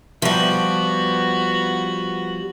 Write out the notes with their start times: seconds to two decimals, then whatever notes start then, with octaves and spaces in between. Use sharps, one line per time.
0.22 F3 G3 B3 F#4